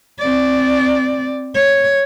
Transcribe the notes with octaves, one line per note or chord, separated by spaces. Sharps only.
C4 D5
C#5